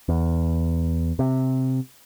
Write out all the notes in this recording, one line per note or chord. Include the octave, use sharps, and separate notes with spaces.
E2
C3